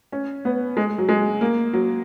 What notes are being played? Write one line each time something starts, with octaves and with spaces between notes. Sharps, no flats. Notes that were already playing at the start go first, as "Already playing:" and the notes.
C#4
B3
G#3
F#3
G#3
A#3
F#3